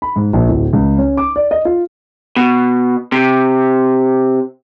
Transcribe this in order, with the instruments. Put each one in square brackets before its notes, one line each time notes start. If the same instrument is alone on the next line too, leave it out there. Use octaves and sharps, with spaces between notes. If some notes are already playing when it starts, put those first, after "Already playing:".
[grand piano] B5
G#2
A#1
D1
C#2
C#4
D6
D5
D#5
F4
[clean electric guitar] B2
C3